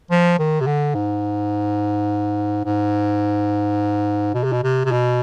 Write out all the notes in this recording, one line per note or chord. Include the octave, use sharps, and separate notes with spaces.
F3
D#3
C3
D3
G#2
G#2
B2
C3
B2
C3
C3
B2